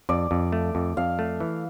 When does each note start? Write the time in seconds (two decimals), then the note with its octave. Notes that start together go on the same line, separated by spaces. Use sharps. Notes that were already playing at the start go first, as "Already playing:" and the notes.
0.09 F2 D5
0.31 F2
0.52 A3
0.75 F2
0.97 F2 F5
1.19 A3
1.40 E3